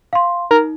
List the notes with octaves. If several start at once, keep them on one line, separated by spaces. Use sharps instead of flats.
F5 C6
D#4 A#4